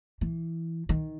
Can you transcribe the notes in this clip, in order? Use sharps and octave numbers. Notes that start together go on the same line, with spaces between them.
E3
D#3